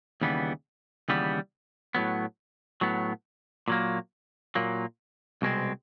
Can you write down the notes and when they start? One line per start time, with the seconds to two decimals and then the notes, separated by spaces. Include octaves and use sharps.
0.21 D#2 C#3 E3 G3 B3
1.09 D#2 C#3 E3 G3 B3
1.95 A2 F#3 B3
2.81 A2 F#3 B3
3.68 A#2 F#3 A#3
4.55 A#2 F#3 A#3
5.42 C2 B2 G#3 C4